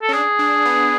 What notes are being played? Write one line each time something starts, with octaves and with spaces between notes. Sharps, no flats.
A4
C#4
D4 G#4
D4
B3